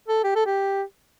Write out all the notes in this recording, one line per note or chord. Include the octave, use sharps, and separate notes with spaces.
A4
G4
A4
G4